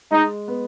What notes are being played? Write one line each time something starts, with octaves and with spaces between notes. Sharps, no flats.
G#3 D#4
B3